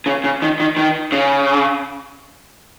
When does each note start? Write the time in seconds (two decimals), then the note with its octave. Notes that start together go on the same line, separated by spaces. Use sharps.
0.06 C#3
0.24 C#3
0.42 D#3
0.60 D#3
0.77 D#3
1.12 C#3